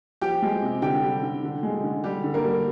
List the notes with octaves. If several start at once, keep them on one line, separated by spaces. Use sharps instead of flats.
F3 G4 G5
G#3
C3
D3 G4 G5
G3
D3
D3
G#3
D3
G3 G4
D3
A#3 A#4
G3